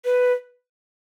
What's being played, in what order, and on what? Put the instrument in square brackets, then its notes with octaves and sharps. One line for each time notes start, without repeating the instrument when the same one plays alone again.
[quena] B4